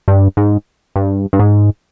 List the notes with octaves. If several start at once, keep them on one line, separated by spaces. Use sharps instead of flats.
G2
G#2
G2
G2
G#2